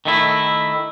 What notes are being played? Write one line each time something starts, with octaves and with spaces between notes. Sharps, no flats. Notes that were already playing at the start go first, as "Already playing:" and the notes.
D#3 A3 E4